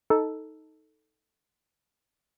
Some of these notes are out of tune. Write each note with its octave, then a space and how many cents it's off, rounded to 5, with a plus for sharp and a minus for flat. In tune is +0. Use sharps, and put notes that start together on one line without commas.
D#4 +10 A4 +0